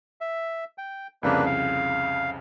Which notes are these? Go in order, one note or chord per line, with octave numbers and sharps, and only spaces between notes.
E5
G5
C2 F2 C#3 A#3 D4 B4
F5